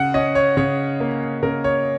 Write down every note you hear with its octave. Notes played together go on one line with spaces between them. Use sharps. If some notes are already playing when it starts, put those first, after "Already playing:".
Already playing: C#3 F#5
C#4 D#5
C#5
C#3 C#5
A#3
C#3 A#4
C#5